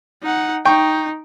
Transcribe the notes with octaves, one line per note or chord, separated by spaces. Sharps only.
D#4 F#5
D#4 G5 C#6